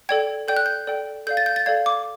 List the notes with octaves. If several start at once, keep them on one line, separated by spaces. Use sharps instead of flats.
A4 D5 G5 G#6
A4 D5 G5 G6
F#6
G6
A4 D5 G5
A4 D5 F5 G6
A6
G6
A6
A4 D5 F5 G#6
D6